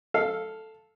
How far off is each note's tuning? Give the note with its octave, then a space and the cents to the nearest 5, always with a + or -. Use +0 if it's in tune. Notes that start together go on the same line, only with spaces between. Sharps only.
A4 +0 F5 +0